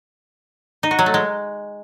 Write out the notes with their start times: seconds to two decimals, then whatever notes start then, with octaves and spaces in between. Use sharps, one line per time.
0.83 D#4
0.91 F#4
0.99 F#3
1.06 A3
1.14 G#3